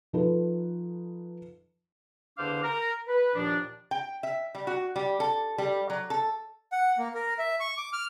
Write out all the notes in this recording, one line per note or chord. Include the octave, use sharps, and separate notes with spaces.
F3 D#4 A4 B4
E2 D3 D4 C5 F5 D6
A#4
B4
D#2 A#2 F3 D4
G5
E5
G3
F#4
G3
A4
G3
F#3
A4
F#5
A#3
A#4
E5
C#6
D6
F6